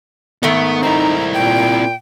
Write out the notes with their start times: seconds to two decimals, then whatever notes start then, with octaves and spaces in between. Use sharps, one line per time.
0.43 G#2 D#3 A3 B3
0.83 C4 D#4 E4 A#5
1.34 A#2 G5